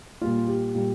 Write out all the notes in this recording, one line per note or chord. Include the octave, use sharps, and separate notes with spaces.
A#2 G3 A#3 F4
G4
A#2 G3 A#3